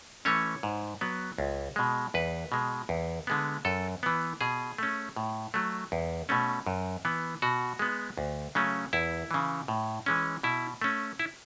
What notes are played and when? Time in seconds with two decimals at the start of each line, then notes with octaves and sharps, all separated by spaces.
0.25 E3 A3 C#4 C#5
0.63 G#2
1.01 F#3 B3
1.38 C#2
1.76 B2 G#3
2.14 E2 B4
2.52 B2 G#3
2.89 E2
3.27 D3 G#3 B3
3.65 F#2 A4
4.03 E3 B3
4.41 B2 G#4
4.78 A3 C#4
5.16 A2
5.54 F#3 A3
5.92 E2
6.29 B2 A3 C#4
6.67 F#2
7.05 E3 B3
7.42 B2 F#4
7.79 G#3 B3
8.18 D2
8.55 C#3 F#3 A3 C#4
8.93 E2 E4
9.31 C#3 E3
9.68 A2
10.06 E3 G#3 C#4
10.43 B2 E4
10.82 A3 C#4
11.19 E4